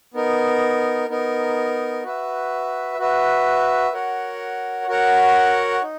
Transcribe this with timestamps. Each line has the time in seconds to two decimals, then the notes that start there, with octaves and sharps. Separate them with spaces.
0.14 B3 D#4 A#4
1.09 B3 D#4 A#4
2.04 F#4 B4 E5
2.98 F#4 B4 E5
3.94 F#4 A#4 C#5 F#5
4.87 F#4 A#4 C#5 F#5
5.82 D#4